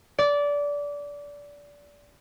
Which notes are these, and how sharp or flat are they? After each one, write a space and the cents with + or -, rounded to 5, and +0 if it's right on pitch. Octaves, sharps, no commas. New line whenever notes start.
D5 -20